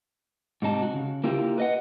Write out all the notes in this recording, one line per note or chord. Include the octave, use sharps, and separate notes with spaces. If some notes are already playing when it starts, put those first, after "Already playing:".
G#2 C3 D#4 A5
F#4
C#3
A#3 E4 F4 G4
B4 D#5 F#5